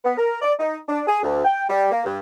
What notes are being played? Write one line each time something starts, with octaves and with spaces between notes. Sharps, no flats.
B3
A#4
D5
D#4
D4
G#4
D2
G5
G3
A#3
G2